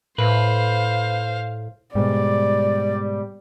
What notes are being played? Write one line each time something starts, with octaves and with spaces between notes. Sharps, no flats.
A2 B4 C5 F5
G#2 B2 G3 D5